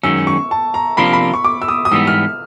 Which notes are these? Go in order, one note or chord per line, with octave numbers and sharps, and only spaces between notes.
F#2 D#3 G#3 C#4 E6
C#6
A5
A#5
C3 F3 A#3 D4 F4 B5
B5
C#6
D6
E6
D#6
D#6
G#2 E3 G3 B3 E6
F6